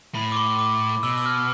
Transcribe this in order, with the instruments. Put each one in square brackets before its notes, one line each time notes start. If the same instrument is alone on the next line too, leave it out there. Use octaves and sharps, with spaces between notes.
[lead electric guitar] A2 [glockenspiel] B5
[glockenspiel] D6
C6
D6
[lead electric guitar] B2 [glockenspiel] E6
[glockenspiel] E6
F6